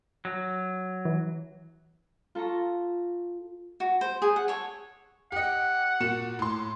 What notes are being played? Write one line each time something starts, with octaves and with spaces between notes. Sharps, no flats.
F#3
E3
F4 A4 A5 A#5 C#6
F#4
C5
G#4
F#5
A4 C#5
G4 D#5 F#5
A#2 F#4 E7
A2 C6